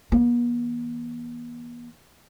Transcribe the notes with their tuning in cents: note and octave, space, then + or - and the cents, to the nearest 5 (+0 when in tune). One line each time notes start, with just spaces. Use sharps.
E3 -30 B3 -45